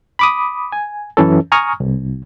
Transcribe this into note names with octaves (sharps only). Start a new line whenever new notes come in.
B5 D6 D#6
G#5
F#2 E3 C#4 A4
G#5 A#5 C#6 D#6 F6
C2